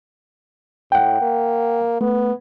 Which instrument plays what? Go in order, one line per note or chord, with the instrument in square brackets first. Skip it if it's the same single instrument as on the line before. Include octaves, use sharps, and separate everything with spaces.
[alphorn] A2 [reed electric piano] F#5 G5
[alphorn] A#3
[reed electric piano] A3 [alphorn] B3